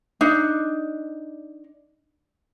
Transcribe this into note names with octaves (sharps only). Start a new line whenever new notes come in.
D4 D#4